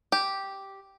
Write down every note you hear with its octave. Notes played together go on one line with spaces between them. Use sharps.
G4